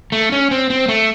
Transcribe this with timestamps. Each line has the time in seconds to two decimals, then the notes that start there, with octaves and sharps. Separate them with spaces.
0.12 A3
0.32 C#4
0.51 C4
0.70 C4
0.89 A3